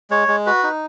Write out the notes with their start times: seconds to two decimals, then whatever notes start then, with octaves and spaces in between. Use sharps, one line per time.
0.10 G#3 C#5
0.28 G#3
0.46 F#4 B4
0.63 D#4